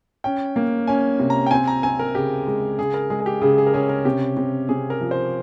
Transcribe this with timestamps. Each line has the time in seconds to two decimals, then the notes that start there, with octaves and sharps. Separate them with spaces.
0.24 C#4 G5
0.56 A#3
0.87 C#4 G#5
1.20 C3
1.30 A#5
1.46 G5
1.51 C4 G#5
1.68 A#5
1.83 C4 G#5
1.99 A#4
2.15 C#3 G4
2.47 G#3
2.79 C#3 G#4
2.94 A#4
3.10 G#3 G#4
3.20 G#4
3.26 G4
3.41 C#3 G#4
3.58 G#4
3.67 A#4
3.74 C#4 G#4
3.89 A#4
4.05 C3 G4
4.37 C3
4.69 C3 G#4
4.90 A#4
5.01 F3
5.11 C5